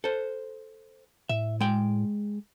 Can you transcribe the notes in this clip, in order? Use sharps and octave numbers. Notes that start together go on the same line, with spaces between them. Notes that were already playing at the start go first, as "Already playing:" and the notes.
A4 C5
A2 E5
G#3 G5